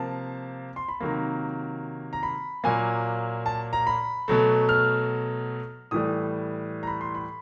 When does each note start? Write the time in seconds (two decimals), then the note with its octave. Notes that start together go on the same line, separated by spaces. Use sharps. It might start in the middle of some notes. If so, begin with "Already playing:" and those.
Already playing: C3 F3 A#3 A5
0.76 C6
0.88 B5
1.00 C3 D#3 F#3 A#3 A#5
2.13 A#5
2.23 B5
2.64 A#2 F#3 A#3 G#5
3.46 A5
3.73 A#5
3.87 B5
4.28 B2 F#3 A3
4.69 F6
5.91 A2 E3 G3 D#6
6.83 A#5
6.87 B5
7.01 C6
7.15 B5